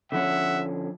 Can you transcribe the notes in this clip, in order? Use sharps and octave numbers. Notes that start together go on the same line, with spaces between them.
D3 F3 C#4 E5 F#5